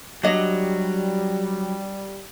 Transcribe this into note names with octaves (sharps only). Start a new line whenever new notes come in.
F#3 G3 D4 D#5